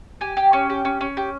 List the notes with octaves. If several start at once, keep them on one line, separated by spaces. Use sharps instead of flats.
G4 G#5
G4
C#4
G4
C#4
C#4
G4